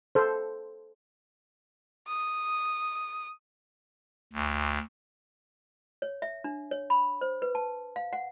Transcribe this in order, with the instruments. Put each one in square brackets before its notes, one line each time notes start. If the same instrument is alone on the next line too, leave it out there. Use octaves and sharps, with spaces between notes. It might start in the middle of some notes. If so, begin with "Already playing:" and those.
[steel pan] A4 C5
[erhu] D#6
[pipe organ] D2
[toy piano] C#5
E5
D4
C#5
B5
C5
B4
A5
F5
F#5